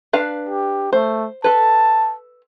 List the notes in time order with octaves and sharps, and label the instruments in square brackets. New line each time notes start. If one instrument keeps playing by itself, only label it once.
[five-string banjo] D4 B4 F5
[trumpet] G4
[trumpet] A3 [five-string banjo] C5
[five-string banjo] A4 B4 [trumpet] A5